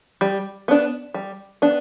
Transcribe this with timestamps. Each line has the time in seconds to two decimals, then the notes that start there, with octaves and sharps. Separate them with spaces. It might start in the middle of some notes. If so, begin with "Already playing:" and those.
0.21 G3
0.68 B3 D4
1.14 G3
1.62 B3 D4